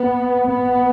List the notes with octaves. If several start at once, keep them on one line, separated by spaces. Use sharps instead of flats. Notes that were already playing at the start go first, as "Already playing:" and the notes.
Already playing: B3
B3